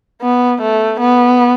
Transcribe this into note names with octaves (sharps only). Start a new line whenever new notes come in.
B3
A3
B3